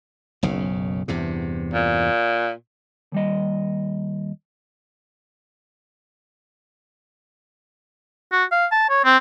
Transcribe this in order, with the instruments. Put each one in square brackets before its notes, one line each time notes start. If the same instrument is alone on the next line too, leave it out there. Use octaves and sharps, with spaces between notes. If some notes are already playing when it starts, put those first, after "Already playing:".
[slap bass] F#1 B1 C#3
E2 G2 C3
[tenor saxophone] A#2
[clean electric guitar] D#2 G3 D#5
[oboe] F#4
F5
A5
C#5
C4